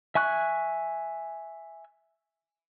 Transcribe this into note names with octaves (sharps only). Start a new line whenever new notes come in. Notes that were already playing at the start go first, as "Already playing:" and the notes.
E5 G#5 C#6 F#6